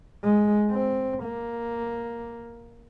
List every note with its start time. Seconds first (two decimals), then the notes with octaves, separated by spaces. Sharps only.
0.23 G#3
0.71 C4
1.24 A#3